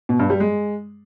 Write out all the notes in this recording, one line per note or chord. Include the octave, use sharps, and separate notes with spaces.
B2
G2
G3
G#3